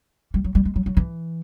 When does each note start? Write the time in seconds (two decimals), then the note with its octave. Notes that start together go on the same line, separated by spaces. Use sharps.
0.34 G3
0.44 F#3
0.55 G3
0.65 G#3
0.76 F#3
0.86 F#3
0.97 E3